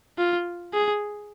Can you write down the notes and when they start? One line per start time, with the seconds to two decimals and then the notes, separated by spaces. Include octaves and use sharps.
0.18 F4
0.73 G#4